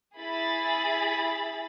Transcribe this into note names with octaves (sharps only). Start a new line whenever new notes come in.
E4 G#4 B5 A6